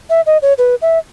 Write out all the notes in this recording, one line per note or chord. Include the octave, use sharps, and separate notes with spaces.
E5
D#5
C#5
B4
E5